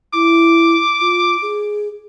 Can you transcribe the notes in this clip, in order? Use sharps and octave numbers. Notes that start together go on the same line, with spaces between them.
E4 D6
F4
G#4